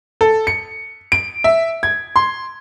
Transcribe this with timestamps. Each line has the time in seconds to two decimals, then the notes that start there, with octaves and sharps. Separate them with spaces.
0.21 A4
0.47 C#7
1.12 D7
1.44 E5
1.83 G#6
2.16 C6